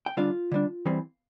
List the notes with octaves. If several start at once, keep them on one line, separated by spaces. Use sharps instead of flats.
G5
D3 G3 D4 F4 F5
D3 G3 D4
E2 E3 G3 C4